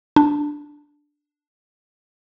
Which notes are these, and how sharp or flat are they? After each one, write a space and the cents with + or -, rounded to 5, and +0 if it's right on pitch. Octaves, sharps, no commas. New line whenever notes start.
D4 +0